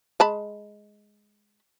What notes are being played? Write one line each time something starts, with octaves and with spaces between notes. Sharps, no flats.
G#3 A5 B5